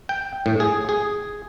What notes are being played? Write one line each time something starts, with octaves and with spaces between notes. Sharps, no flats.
G5
A2
G#4
G#4